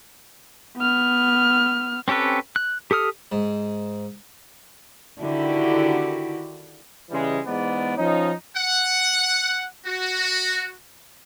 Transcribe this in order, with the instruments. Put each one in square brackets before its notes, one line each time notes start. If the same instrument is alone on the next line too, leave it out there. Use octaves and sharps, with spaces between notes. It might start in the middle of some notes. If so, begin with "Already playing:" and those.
[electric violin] B3 F6
[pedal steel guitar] C4 C#4 G4 A4 B4
F#6
G4 A4 D#6 F6
[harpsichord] G#2
[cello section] D3 D#3 E4 F#4 G4
[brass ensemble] C#3 E3 G3 G#3
E2 G#2 B3 D5
F3 C#4 D#4
[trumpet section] F#5
F#4